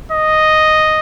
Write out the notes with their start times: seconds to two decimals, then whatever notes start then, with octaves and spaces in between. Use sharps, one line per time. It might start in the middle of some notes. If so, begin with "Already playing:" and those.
0.12 D#5